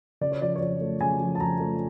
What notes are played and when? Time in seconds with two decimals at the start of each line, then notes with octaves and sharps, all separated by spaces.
0.21 C#3 D5
0.31 C#5
0.41 F3 D5
0.56 C#5
0.61 F2 D5
0.81 A3
1.00 C#3 G#5
1.21 F3
1.35 A5
1.40 F2 A#5
1.60 A3